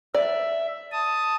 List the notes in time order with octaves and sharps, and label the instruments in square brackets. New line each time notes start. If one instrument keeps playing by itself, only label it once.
[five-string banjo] D5 [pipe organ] E5
[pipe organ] A5 D#6